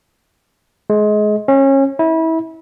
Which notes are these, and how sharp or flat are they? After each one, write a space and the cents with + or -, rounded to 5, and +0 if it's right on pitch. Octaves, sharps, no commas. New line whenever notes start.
G#3 +25
C#4 -25
E4 -30